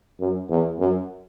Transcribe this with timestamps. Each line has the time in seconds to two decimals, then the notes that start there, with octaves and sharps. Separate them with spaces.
0.20 F#2
0.49 E2
0.79 F#2